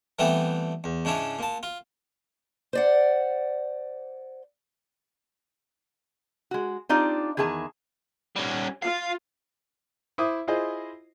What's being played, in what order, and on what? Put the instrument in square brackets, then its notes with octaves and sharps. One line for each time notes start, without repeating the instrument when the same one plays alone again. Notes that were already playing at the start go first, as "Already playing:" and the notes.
[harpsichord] E3 G3 A3 B3 C4 E4
E2
G#2 C#3 C#4 D4 E4
A#2 A5
F4
[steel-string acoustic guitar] C5 D5 F#5
[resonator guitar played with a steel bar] G#3 F#4
C4 D4 D#4 F4 G4 D5
E2 D#3 G#4 G#5 A5
[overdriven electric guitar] G3 C#4
[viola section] F4 [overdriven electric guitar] F5
[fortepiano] E4 C5 E5 D6 D#6
E4 F4 G#4 C5 D#5